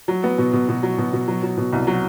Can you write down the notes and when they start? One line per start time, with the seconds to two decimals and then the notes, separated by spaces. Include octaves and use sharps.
0.08 F#3
0.24 B3
0.38 B2
0.53 B2
0.69 B2
0.83 F#3
0.98 B2
1.13 B2
1.28 F#3
1.43 F#3
1.57 B2
1.73 C2
1.87 F#3